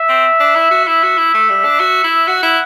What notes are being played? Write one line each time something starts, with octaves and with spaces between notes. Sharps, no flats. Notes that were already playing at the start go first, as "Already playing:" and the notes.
Already playing: E5
C4
D4
E4
F#4
E4 E5
F#4
E4
A3
G3
D4
F#4
E4
F#4 F#5
E4